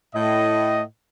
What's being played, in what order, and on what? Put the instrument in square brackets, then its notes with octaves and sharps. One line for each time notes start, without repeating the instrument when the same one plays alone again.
[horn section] A2 D#5